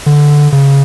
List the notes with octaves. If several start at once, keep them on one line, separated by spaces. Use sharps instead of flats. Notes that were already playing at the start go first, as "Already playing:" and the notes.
D3
C#3